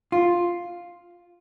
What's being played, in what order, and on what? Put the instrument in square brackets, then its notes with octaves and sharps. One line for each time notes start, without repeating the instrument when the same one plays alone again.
[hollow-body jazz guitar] F4